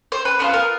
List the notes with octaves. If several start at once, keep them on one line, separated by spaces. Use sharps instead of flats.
C5
B4
B3 D4 F4 C5
A#4